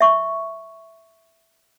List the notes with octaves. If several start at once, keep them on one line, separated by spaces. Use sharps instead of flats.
E5 C#6